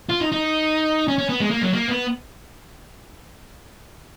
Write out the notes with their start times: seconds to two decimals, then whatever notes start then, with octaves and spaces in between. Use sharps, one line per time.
0.09 F4
0.20 D#4
0.32 D#4
1.08 C#4
1.18 C#4
1.29 B3
1.40 G#3
1.51 A#3
1.62 F#3
1.73 A#3
1.89 B3